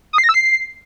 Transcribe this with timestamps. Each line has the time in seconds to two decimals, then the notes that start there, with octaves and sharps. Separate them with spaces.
0.13 D#6
0.18 C7
0.24 A#6
0.29 E6
0.34 C7